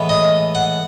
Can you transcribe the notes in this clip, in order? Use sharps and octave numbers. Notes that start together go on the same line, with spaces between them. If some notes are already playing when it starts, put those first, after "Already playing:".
Already playing: A2 E3 G#3 B3
D#5
F#5